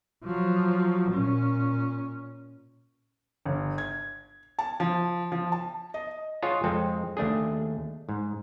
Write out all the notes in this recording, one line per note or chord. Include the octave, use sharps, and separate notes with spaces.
F3 F#3
A#2 C#4
G1
G#6
A5
F3
F3
A5
D#5
F4 G#4 C#5 D#5 F#5 A5
F2 G#3 C4 A4
D#2 A3 D4 G#4
G#2